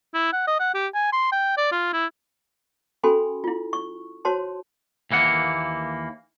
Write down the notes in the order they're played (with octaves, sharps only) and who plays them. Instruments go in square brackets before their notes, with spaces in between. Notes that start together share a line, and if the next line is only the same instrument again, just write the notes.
[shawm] E4
F#5
D#5
F#5
G4
G#5
C6
G5
D5
F4
E4
[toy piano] C#4 F#4 A4 G#5 B5 C6
E4 F4
C#6
F#4 C5 C#5 A5 C6
[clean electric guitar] D#2 E3 A#3 F#5